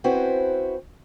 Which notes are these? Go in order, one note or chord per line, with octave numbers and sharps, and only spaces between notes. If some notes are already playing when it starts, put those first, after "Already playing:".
C4 C#4 E4 F#4 B4 C5